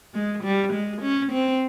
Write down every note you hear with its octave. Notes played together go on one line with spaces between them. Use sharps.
G#3
G3
G#3
C#4
C4